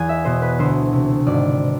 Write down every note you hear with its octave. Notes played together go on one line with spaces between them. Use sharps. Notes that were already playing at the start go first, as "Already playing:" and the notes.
Already playing: E2 G#5
E5
B2 C5
B4
D2 C5
C3
G#1 D5